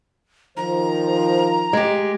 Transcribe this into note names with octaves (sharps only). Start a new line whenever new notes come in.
D#3 F3 C5 A#5
G#3 G4